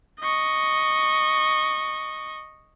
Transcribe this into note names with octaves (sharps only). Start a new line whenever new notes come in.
D#5 C#6